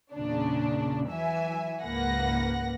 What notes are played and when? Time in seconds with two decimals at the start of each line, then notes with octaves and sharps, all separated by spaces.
0.14 E2 A#2 C#3 D4
1.09 E3 F#3 E5 G#5
1.83 C#2 G#2 A#3 B4 F#5 A#6